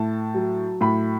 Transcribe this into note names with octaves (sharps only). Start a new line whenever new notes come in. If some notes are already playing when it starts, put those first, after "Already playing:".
Already playing: A2 A5
F#3
A2 B5